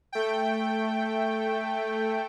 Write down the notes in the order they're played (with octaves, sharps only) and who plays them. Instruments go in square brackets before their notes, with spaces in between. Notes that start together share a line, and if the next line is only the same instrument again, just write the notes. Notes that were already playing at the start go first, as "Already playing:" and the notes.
[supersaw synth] A3 G5